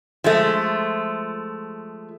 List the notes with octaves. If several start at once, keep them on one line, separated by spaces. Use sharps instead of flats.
F3 G#3 A3